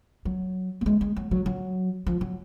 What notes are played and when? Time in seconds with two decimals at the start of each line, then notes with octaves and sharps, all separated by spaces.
0.25 F#3
0.81 A#3
0.86 G#3
1.01 G#3
1.16 F#3
1.31 F#3
1.46 F#3
2.07 F3
2.21 F#3